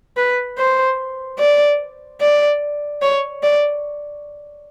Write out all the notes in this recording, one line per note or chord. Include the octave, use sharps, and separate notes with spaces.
B4
C5
D5
D5
C#5
D5